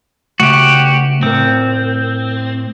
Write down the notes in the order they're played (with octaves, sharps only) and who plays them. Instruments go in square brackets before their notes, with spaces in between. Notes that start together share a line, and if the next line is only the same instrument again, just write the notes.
[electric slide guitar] C#3 A3 [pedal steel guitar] F#4 G4
[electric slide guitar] A2 A#4 [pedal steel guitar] C4